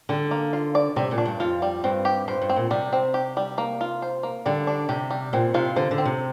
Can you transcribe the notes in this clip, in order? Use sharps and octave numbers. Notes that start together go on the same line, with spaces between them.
D3 G3
A#3
F4
D5
C3 G3
A#2
D4
G2
F2 F4
G3
G2 C4
G4
G2 C5
G2
C4
A#2
C3 G3
C4
G4
G3
A#3
F4
C5
A#3
D3 G3
D4
C3 G4
G3
A#2 C4
C3 F4
D3 C5
D3
C4
C3